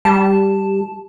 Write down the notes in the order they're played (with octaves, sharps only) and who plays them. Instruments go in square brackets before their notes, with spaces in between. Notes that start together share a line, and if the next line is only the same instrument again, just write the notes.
[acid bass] G3 [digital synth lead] A5